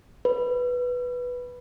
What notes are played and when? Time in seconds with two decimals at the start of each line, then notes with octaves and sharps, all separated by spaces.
0.25 B4